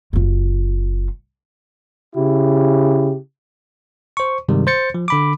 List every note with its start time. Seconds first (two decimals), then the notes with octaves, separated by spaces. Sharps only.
0.13 F#1 F4
2.15 C#3 E4 G4
4.17 C5 C#6
4.48 G2 C3 D#3 G3 G#3
4.67 C5 G6 A6 C#7
4.94 F3
5.08 D3 B5 D6